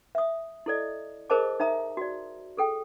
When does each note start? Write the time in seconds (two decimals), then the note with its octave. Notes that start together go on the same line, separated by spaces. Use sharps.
0.15 E5 D#6
0.66 E4 A4 D5 D#5
1.30 G#4 A#4 C5 D#5 A5 D6
1.60 D#4 E5 A#5 D#6
1.97 F#4 D5
2.57 G#4 A4 G5